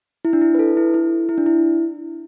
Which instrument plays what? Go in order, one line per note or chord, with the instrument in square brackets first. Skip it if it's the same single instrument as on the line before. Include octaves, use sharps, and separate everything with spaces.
[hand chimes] E4
D4
E4
B4
A4
E4
E4
E4
D4
E4